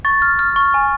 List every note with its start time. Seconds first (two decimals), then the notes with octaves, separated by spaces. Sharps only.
0.05 C#6 A6
0.22 F6
0.39 F6
0.56 C#6
0.74 G#5